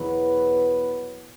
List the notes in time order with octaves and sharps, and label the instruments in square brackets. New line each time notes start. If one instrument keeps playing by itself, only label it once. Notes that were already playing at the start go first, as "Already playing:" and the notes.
Already playing: [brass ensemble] E2 B2 F#3 B3 B4